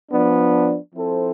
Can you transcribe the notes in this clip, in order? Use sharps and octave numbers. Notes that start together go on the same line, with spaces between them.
F3 B3 D4
F3 C4 E4 A4 C5